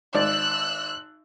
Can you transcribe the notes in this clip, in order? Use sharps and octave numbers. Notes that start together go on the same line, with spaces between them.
G#1 D5 E6 F#6